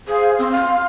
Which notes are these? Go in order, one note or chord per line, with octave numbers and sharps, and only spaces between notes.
G#4 C5 F5
C4 C6
F5